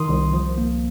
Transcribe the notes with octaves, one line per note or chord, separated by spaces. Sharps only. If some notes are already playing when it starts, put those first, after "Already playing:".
Already playing: D#3 C6 D#6
C2
F3
A#3